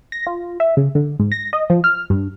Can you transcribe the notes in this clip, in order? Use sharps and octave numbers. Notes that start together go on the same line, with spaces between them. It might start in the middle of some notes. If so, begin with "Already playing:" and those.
A#6
F4
E5
C#3
D3
G#2
A#6
D#5
F3
F6
G2